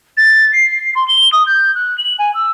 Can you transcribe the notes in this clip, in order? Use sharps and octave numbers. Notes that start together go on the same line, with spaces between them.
A6
C7
C6
G7
D#6
G6
F#6
F#7
G#5
E6